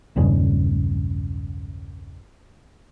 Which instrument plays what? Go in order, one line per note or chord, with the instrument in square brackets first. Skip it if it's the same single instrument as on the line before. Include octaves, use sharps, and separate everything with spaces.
[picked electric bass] B1 E2 G2 C#3